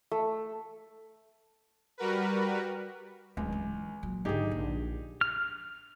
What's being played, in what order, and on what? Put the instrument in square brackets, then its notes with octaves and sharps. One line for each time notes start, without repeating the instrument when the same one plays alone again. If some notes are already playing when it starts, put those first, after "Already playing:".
[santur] A3
[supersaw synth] G3 F#4 A#4 B4
[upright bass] D1 [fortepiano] C#2
[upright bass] E3
A#2 F#3
[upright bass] G#2 D3 [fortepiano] D#4 G4 G#4
[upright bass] A#1
[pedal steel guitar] F6